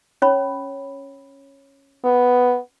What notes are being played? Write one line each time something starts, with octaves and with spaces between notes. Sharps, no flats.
C#4 C#5 B5
B3